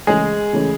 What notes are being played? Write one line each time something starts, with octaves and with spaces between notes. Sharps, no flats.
C#3 E3 G#3 A3 C#4 G#4
C#3 E3 A3 C#4